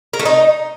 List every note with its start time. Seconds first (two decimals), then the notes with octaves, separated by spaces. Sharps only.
0.13 A#4
0.19 A3
0.25 D#4